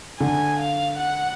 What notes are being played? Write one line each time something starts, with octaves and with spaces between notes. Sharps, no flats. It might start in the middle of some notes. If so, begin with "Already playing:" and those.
D3 G#5
F5
F#5